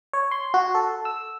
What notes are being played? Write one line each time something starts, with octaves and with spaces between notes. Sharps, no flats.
C#5
C6
F#4
A4
E6